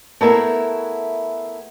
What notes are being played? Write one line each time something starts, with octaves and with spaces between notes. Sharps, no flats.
A3 B3 E4 G#4 A#4 E5